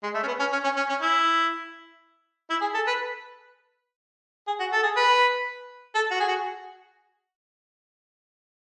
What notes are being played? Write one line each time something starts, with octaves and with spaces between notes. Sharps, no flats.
G#3
A3
C#4
B3
C#4
C#4
C#4
C#4
C#4
E4
E4
G#4
A4
B4
G#4
F#4
A4
G#4
B4
A4
F#4
G#4
F#4